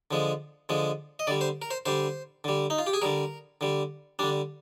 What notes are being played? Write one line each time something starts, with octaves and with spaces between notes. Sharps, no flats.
D3 F3 G#3
D3 F3 G#3
D#5
D3 G3 D5
C5
A#4
C5
D3 G3 C5
D3 G3
D#4
F4
G4
G#4
D3 G3 A#4
D3 G3
D3 G3 D4